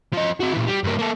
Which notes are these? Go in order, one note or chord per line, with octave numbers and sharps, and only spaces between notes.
F3 D#5
C4 F#4
A#2 E3
G3
G2 A#3
A#3 A4